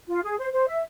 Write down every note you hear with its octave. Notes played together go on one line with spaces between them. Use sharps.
F4
G#4
C5
C5
E5